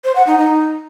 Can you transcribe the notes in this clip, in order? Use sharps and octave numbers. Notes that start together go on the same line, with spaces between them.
C5
F#5
D#4
D#4